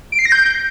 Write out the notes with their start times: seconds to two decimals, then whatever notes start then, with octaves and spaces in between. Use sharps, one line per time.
0.12 D7
0.19 C7
0.25 A#6
0.32 G6